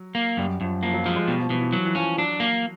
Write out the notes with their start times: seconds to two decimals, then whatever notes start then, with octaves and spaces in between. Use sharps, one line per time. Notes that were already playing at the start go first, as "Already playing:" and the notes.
Already playing: F#3
0.15 A#3
0.37 F#2 G3
0.61 F#2 F3
0.83 F3 A#3
0.94 F#3
1.06 F3 G#3
1.16 G#3
1.28 B2 G3
1.40 F3
1.50 B2 E3
1.62 E3
1.73 E3 F#3
1.85 E3
1.95 F3 C#4
2.17 F#3 D4
2.40 A#3